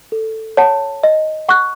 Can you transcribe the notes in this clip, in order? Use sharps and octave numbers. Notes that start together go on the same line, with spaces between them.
A4
C#5 F#5 A5
D#5
F#5 C#6 F#6